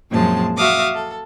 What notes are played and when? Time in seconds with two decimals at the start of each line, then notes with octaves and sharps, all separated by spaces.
0.10 F#2 A#2 F3 G#3 C4 A5
0.57 F#4 E5 F5 D6 D#6
0.94 A4